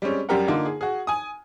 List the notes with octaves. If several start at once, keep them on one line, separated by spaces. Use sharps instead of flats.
G3 G#3 C4 C#4
F#2 G3 G4 A#4 F#5
D3 A#3 D#4 F4
G#4
F#4 G#4
G#5 D#6